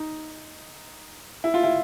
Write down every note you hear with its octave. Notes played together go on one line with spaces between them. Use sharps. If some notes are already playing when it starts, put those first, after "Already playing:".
Already playing: D#4
E4
F4
E4